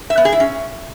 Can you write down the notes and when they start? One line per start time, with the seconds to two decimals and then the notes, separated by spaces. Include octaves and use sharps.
0.10 E5
0.18 B3
0.25 G#4
0.33 E4
0.40 C#4